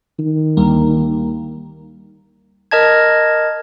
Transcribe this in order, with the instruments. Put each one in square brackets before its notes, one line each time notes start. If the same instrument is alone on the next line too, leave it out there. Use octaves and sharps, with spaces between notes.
[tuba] D#3
[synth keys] D2 G3 A#3
[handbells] A#4 D#5 A5 G#6